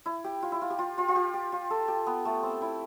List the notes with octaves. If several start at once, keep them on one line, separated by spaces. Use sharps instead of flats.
E4
G4
F4
E4
F4
G4
F4
F4
F4
G4
G4
F4
A4
G4
B3
A3
C4
E4